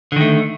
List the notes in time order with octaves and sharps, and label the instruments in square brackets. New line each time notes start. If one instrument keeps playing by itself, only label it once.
[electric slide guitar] D3
D#3
A3